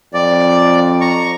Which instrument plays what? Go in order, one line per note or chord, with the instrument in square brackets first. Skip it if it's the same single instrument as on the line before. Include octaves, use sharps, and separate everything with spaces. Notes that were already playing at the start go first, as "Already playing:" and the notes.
[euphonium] F2 [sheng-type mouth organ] D5
[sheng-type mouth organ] A#5 C#6